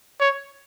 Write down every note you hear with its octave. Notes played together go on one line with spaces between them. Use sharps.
C#5